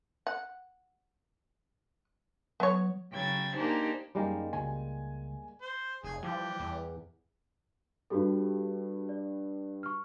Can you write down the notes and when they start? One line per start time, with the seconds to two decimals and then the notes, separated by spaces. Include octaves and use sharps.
0.27 F#5
2.60 F#3 B3 C#5
3.12 C#3 F#3 G5 B5 G#6 A6
3.54 A#3 D4 D#4 G4 G#4 C5
4.15 F#2 G3 G#3 A#3 D#4
4.53 C#2 G#5
5.62 C5
6.04 F1 G#4
6.23 E3 F3 G3 G4
6.60 E2
8.10 G2 G3 F#4 G4 A4
9.09 D5
9.83 C#6 F6